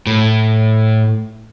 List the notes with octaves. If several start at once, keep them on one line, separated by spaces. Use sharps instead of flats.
A2